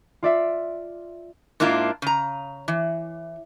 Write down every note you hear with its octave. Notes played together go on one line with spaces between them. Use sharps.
F4 D5 E5
G#2 A#3 D4 E4 F4
C#3 A#5
E3